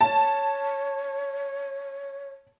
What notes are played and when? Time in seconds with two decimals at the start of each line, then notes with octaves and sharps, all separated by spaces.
0.01 C#5 A5